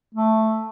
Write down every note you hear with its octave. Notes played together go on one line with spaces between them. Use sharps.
A3